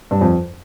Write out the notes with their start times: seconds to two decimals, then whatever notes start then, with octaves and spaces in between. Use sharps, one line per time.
0.11 G2
0.21 F2